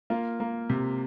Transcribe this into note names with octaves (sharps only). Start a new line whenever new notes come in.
A#3 F4
A#3
C3